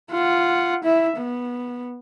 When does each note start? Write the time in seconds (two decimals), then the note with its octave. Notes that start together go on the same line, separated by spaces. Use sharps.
0.11 F4 F#5
0.84 E4 E5
1.17 B3